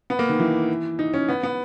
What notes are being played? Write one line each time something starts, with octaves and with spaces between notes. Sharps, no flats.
B3
A#3
D#3
E3
D#4
C#4
B3
B3